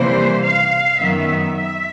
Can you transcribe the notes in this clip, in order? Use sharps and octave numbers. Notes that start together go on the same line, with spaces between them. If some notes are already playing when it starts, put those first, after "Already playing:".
Already playing: C3 E3 G3 A#3 C5
F5
F#2 D#3 F#3 B3 E5
E5